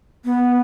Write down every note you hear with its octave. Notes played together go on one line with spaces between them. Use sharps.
B3